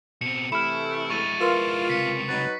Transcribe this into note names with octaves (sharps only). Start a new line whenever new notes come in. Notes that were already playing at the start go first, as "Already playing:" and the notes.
B2 C4 C#7
C3 E3 A3 E4 B5 F6
G#3 E4 C#6 A6 D#7
F4 A#4 B4 C6
C#2 C3 B6 C#7
F#3 D#4 B4 A6